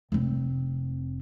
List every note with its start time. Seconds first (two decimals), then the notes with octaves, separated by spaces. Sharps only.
0.12 F1 C4